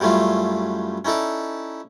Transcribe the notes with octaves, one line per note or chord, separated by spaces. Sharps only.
F#2 G3 A3 C#4 E4 F4
C#4 D#4 E4 A4 D5